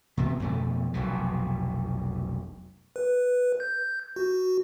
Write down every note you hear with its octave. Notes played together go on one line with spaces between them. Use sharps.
C3 B3
F2 B2 A3
F1 B1 B2
B4
G6
F#4